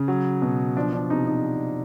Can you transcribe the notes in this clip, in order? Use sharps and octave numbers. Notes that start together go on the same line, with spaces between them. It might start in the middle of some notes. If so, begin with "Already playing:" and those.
Already playing: C#3
F#3
B2
F3 D4
D4
C3 D#4
D#4